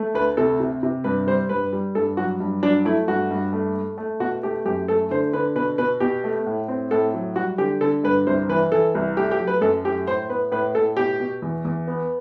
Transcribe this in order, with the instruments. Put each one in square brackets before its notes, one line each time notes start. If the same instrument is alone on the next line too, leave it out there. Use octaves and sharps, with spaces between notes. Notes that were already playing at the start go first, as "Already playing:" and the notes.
Already playing: [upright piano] A3
D2 B4
C3 A4
C3
C3
G2 B4
G3 C5
G2 B4
G3
G2 A4
F#3 F#4
G2
F#3 D4
A3 E4
G2 F#4
G2
A3
A3
A3
B2 F#4
A3 G4
F#2 G4
A3 A4
D3 C5
D3 B4
B2 B4
B2 B4
B2 G4
A3
A2
C4
A2 A4
F#3
G3 F#4
D3 G4
D3 A4
G2 B4
C2 C5
E3 B4
E3 A4
C2
A3 G4
G4
F#3
B4
F#2 A4
A3 G4
A2 C5
B3 B4
A2 B4
A2 A4
B2 G4
B2
E2
E2
B3